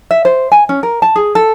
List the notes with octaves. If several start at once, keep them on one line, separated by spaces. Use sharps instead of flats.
E5
C5
G#5
C#4
A#4
A5
G#4
A4